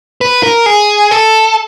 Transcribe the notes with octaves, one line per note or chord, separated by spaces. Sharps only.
B4
A#4
G#4
A4